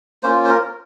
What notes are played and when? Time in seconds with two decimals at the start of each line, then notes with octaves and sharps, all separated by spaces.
0.23 A#3 C#4 F4 C5
0.45 C5
0.50 A#4